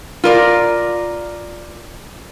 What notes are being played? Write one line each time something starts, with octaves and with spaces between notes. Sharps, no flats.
F4 A#4 D5